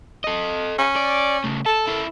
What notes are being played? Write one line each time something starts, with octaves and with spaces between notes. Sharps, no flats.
A4 D#5
C#4
D5
C#3 A3
A4 A5
E4 A#4